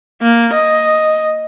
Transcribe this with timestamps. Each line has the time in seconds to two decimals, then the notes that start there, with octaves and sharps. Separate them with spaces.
0.22 A#3
0.53 D#5